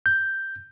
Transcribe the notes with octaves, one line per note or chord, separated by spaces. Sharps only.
G6